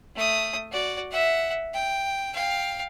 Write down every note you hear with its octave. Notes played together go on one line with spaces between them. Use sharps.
A3 D#6
F#4 D5
E5 F#5
G5
F5 G5